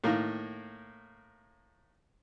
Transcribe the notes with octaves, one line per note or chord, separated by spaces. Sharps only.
A2 D#3 A#3